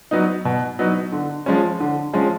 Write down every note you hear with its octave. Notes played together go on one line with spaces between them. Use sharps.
F#3 B3 D#4
B2
F#3 B3 D#4
D3
F3 G#3 C#4
D3
F3 G#3 C#4